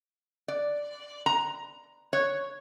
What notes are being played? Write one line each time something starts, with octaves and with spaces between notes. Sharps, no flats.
D5
A#5
C#5